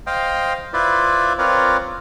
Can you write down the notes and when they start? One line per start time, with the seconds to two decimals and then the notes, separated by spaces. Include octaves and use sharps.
0.07 C5 D#5 F5 G5
0.73 E4 F4 B4 C5 D5
1.38 C4 F4 A#4 B4 C#5 D5